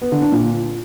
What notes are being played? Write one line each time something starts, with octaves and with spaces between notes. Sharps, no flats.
B3
D3
D4
A#2